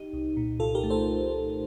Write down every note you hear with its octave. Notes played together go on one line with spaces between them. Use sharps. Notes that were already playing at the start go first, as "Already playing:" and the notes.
Already playing: D#4 G4
C2
A#2
C2 F4 A4
G4 A#4
A3
A4 C5